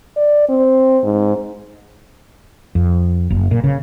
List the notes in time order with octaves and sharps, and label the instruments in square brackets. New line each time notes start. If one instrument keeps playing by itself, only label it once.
[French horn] D5
C4
G#2
[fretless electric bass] F2
F#1
A#2
C#3